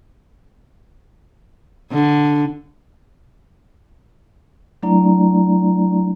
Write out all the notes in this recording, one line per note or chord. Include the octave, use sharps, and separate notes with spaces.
D3
F#3 A3 D4 E4 D5 A#5